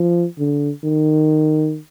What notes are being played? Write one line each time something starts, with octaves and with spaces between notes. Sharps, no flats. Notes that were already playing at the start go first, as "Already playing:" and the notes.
Already playing: F3
D3
D#3